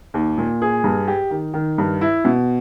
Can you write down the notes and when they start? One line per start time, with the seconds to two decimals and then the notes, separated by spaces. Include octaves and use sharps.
0.14 D#2
0.38 A#2
0.62 G#4
0.84 G2
1.08 G4
1.30 D#3
1.54 D#3
1.78 G2
2.01 E4
2.25 B2